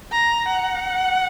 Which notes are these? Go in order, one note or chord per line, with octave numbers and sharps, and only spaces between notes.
A#5
F#5